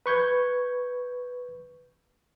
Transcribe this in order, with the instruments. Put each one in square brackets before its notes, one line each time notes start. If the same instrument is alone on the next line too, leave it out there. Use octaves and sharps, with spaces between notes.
[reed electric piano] B4 C#6 G6 G#6